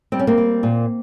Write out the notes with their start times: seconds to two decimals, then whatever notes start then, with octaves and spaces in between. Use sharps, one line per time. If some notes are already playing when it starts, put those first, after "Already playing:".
0.12 G3 C4
0.19 C#4
0.27 A#3 C4
0.37 G3
0.63 A#2